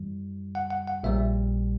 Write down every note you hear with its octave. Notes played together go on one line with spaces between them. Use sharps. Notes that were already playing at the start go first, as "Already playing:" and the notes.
Already playing: F#2 E3 G3
F#5
F#5
F#5
A#1 A#2 G3 E5